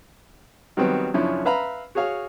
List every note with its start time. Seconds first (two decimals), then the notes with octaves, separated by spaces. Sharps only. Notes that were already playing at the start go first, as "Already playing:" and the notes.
0.77 D#3 F#3 G3 B3 C4
1.14 F#2 C#3 F3 C#4 D4 E4
1.45 B4 E5 F5 A#5 B5
1.95 F#4 G#4 C#5 F5